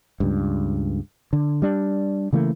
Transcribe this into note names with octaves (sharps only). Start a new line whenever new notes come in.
C#2 G2
D3
G3 D4
C#3 E3 A3 A#3